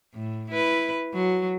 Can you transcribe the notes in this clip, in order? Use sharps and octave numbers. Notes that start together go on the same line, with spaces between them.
A2
E4 B4
F#3